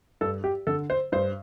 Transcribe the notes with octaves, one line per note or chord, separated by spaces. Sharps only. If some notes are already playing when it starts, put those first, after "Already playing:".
G2 A4
G4
D3 A4
C5
G2 C5